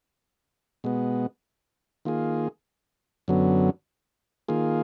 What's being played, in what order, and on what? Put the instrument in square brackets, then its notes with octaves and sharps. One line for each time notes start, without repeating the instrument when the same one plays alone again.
[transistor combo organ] B2 G#3 B3
D#3 A#3 F4 G#4
F#2 D3 F#3 B3
D#3 A#3 F4 G#4